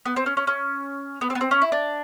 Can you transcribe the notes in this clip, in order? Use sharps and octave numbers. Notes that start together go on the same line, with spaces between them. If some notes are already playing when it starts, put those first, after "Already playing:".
B3
C4
C#4
C#4
C#4
B3
C4
B3
C4
C#4
E4
D4